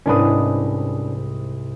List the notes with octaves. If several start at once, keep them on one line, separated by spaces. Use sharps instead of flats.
C2 G#2 C#4 D4 B4 D#6